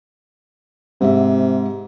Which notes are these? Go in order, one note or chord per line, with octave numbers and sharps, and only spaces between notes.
G#2 C3 E5